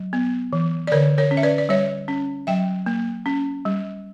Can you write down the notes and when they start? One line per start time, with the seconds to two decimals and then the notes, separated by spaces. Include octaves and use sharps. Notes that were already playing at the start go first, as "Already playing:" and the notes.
Already playing: F#3
0.13 B3
0.53 E3
0.87 D5
0.92 D3 A#4 C#5
1.18 A#4 C#5
1.31 C#4
1.37 E5
1.43 B4 D5
1.58 D5
1.69 G3 C#5 E5
2.08 C#4
2.47 F#3 E5 G5
2.86 A#3
3.26 C#4
3.65 G3